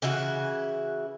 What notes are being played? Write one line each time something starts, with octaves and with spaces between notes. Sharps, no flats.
C#3 E3 E4 F#4